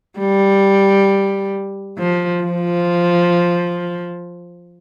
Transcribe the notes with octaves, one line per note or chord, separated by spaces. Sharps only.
G3
F3
F3